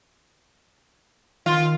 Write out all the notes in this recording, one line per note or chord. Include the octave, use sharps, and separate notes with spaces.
D#3 F4